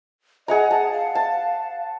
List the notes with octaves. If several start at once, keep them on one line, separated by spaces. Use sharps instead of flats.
G#4 D#5 F#5 A#5
F#5 A5
F5
A5